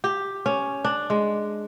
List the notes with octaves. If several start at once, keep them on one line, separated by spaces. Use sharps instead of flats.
G4
C#4
D4
G#3